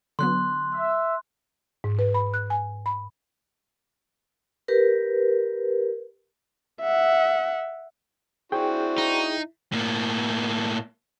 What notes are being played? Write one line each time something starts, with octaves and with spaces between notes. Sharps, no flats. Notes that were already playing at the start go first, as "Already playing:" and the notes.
D3 F#3 B3 C6 F#6
E5
G#2
B4
B5
F#6
G#5
B5
G4 A#4 B4
E5 F#5
C4 D4 E4 F#4 G#4 G5
D#4
A2 A#3